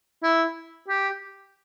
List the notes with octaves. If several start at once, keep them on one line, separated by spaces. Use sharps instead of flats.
E4
G4